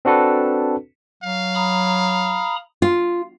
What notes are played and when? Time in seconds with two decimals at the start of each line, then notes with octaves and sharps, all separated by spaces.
0.05 C4 D4 F#4 A4 B4
1.23 F#3 F5
1.55 A#5 B5 D#6
2.82 F4